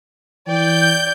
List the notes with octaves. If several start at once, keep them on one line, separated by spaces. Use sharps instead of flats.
E3 D5 G5 G6